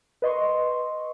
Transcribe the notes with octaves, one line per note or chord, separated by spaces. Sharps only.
B4 D#5 C6 C#6